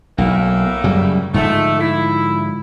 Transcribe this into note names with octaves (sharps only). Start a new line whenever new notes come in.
B1 A2 A3 A#3
F#2 C#3 G3
G#2 D3 F3 A3
E4